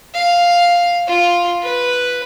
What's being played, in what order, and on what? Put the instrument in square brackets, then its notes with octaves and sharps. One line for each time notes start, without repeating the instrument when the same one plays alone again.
[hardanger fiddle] F5
F4
B4